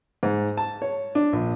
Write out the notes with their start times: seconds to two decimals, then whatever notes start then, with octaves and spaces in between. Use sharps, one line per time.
0.23 G#2
0.57 A5
0.82 C#5
1.15 D4
1.33 A#1